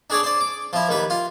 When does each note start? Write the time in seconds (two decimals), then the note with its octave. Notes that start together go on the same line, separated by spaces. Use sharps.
0.10 D4 G#4 C#5 D5
0.23 C5 D5
0.40 D6
0.73 F3 E4
0.89 D#2 G3 B4
1.10 F4